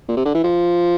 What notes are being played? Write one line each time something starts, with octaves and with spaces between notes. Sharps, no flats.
A#2
C3
D3
E3
F3